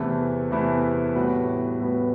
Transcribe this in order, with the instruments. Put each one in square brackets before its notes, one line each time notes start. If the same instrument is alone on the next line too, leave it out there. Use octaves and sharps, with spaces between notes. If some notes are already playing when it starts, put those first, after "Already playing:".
Already playing: [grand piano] E2 C3 E3 A3 E4
E2 C3 E3 A3 E4
A2 G3 B3 F#4 B4
A2 G3 B3 F#4 B4